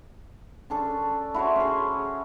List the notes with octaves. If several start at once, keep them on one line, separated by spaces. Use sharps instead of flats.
C#4 D4 A4
E4 F#4 C5 C#5
C#4 G#4